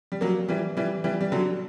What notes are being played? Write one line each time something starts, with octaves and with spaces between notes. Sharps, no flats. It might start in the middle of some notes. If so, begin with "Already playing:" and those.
G3
F#3 A#3
E3 G3
E3 G3
E3 G3
G3
D3 F#3